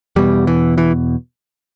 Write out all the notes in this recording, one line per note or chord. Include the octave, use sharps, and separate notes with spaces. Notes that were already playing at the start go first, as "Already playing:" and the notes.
E2 B2 G3
E3
E3